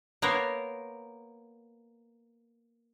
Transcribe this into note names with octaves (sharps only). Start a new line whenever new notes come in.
A#3 B3 A#4 C5 C#5